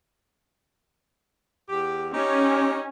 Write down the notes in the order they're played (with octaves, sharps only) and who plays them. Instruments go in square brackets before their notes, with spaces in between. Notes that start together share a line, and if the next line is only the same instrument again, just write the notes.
[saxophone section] E2 G4
[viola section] C#4 [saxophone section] D#4 G4